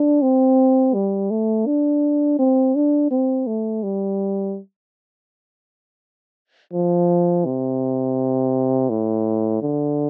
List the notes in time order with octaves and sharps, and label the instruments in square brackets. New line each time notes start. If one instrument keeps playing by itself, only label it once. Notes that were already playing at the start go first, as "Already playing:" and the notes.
Already playing: [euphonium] D4
C4
G3
A3
D4
C4
D4
C4
A3
G3
F3
C3
A2
D3